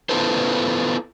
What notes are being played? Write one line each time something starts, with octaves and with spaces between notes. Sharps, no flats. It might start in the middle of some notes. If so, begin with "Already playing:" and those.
B3 E4 F4 A4 B4 C5